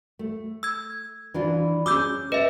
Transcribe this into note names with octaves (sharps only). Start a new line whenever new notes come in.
A3
E6 G#6
E3 D4 F4
C#4 G#4 D6 E6 G6
B4 D#5 E5